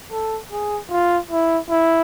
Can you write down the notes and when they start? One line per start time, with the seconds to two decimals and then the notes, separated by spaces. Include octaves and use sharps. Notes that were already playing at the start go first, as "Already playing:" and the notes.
0.11 A4
0.51 G#4
0.91 F4
1.31 E4
1.70 E4